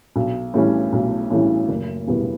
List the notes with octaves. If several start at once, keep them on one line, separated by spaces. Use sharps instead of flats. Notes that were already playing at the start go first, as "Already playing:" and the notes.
B1
A2 E3 G3 C#4
B1
A2 E3 G3 C#4
F#1
E2 B2 G3 B3